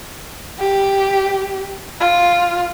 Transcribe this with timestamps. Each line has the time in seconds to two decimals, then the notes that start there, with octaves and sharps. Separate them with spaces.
0.60 G4
2.00 F4